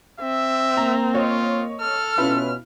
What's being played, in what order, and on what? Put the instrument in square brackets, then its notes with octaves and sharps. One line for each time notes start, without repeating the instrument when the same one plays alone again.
[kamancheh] C4 [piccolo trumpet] E5
[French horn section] A#3 [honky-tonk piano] A#5
[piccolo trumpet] F4 [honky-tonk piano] C#5 D#5
[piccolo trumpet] A4 [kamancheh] F6
[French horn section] B2 C#4 [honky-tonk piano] E4 F4 B4